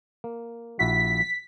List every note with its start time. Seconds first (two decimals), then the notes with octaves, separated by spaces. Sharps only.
0.24 A#3
0.79 A#1 E4 F#4 B6